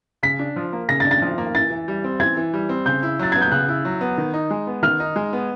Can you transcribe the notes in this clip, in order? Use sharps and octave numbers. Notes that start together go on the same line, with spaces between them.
C#3 B6
D4
F3
A#3
C#3 A#6
A6
D4
A6
F3
A#3
E3 A6
E3
G3
C4
E3 G#6
E3
G3
C4
C#3 G6
E4
F#3 A6
B3 G#6
G6
C#3 F#6
E4
F#3
B3
D#3
D#4
G#3
B3
D#3 F6
D#4
G#3
B3